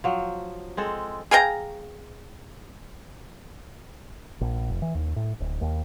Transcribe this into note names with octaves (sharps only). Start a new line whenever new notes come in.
F3 F#3
G#3 C4 A4
G#4 F5 G5 A#5
A#1
F1
E3
D#2
A2
D1
D#2